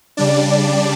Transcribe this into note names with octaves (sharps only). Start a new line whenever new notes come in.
C#3 G3 D4 D5